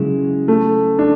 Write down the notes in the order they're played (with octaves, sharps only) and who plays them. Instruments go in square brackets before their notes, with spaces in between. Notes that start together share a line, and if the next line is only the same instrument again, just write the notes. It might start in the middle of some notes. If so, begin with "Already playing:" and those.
Already playing: [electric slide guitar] C#3 F#3 C#4 E4 [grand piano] G#3
[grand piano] A3
D4